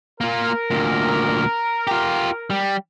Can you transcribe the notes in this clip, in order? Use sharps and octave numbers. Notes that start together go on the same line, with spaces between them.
A#3 F4 A#4
D2 A#2
F4 G4
G3